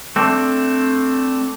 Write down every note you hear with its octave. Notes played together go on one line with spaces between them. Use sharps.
A3 C4 D4